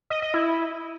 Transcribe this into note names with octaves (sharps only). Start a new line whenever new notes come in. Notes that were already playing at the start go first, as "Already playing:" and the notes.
D#5
D#5
E4